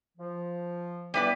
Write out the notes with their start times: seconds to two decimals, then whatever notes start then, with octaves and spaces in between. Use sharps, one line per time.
0.18 F3
1.14 E3 G3 B3 B4 D5